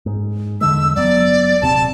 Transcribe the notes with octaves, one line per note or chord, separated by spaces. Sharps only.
G#2
E2 D3 G#3 E6
F#1 F#3 B3 D5
D#1 C3 C4 A5